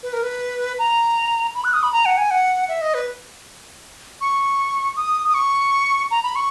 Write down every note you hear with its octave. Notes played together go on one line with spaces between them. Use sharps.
B4
A#4
B4
A#5
B5
F#6
D#6
B5
A#5
F#5
G#5
F#5
E5
D#5
B4
C#6
D#6
D#6
C#6
A#5
B5
C#6